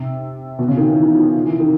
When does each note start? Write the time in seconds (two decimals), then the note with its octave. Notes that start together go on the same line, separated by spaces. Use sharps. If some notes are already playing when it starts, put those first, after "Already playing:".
Already playing: C3
0.59 B2
0.68 C#3
0.77 D#3
0.96 E3
1.15 F3
1.46 E3
1.60 D#3